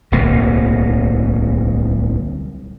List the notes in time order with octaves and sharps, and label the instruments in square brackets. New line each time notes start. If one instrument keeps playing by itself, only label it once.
[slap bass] D1 C2 B2 A#3